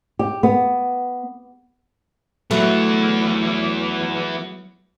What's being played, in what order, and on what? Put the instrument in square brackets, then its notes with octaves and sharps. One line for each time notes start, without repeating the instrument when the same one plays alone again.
[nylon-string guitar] G4
B3
[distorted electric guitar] E3 B3 [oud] F#3 A3